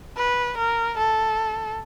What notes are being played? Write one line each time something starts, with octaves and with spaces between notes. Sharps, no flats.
B4
A#4
A4